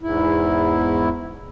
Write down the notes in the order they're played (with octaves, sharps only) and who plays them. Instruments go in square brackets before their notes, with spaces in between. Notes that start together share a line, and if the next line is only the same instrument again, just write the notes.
[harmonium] E2 G#2 E4